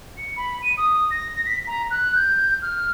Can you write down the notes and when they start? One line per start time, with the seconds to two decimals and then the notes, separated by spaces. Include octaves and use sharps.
0.18 C#7
0.37 B5
0.62 D#7
0.78 D#6
1.11 A#6
1.46 B6
1.67 A#5
1.91 F#6
2.16 G6
2.62 F6